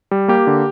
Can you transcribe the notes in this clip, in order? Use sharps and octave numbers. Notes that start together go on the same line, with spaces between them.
G3
A#3 G4
D3